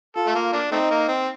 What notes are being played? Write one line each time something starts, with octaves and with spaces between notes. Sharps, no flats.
F4 A4
A3
A#3
A#3 D4
A3 C4 D#4
A#3
C4